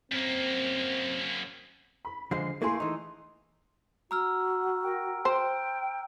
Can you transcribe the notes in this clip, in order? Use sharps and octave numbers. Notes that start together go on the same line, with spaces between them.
F#2 A#3 C4
B5
D3 F3 G#3 C7
A3 A#3 E4 G#4 C6
E3 D#4
F#4 A#5 E6 F6
A#4 F#5 G5
C5 G5